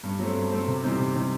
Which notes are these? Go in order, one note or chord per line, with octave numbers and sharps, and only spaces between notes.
G2
F#3 A3 C4
G2
F#3 A3 C4
C3
E3 G3 C4 D#4
C3
E3 G3 C4 D#4